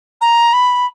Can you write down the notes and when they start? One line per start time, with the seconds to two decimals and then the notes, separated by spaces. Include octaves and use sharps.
0.21 A#5
0.53 B5